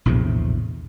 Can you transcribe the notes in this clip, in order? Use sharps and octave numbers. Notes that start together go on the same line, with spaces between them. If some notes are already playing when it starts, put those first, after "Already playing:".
A#1 E2 A2 C3